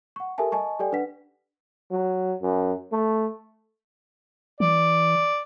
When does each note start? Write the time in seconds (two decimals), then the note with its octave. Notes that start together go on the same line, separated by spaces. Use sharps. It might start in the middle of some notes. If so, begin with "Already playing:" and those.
0.16 F#5 C#6
0.38 G4 A4 A#4 E5 G#5 A5
0.52 D#5 G#5 A5 C#6
0.79 G4 A4 D5 G5 G#5
0.92 D4 B4 F#5 B6
1.91 F#3
2.42 F#2
2.92 A3
4.60 E3 D5